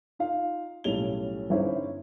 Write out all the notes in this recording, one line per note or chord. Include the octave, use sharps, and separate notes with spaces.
D#4 F4 F5
B1 A2 G3 C#4 F7 G7
G1 C#4 D#4 E4 C5 E5